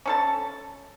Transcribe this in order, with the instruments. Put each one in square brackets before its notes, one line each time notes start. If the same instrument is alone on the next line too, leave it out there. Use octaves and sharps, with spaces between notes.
[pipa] C#4 A4 A5